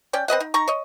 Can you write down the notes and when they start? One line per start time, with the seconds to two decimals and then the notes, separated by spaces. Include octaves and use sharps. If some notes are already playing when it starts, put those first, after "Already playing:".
0.13 C#4 D5 G5
0.28 C4 B4 D#5 F#5
0.40 D#4
0.54 D#4 A#5 C#6
0.68 C#5 D#5